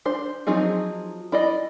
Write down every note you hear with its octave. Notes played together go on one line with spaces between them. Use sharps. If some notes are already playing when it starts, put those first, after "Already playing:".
D4 C5
F3 F#3 C4 D#4 G#4
E4 D5 D#5